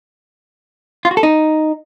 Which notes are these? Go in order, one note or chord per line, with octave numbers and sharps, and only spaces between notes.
F4
F#4
A4
D#4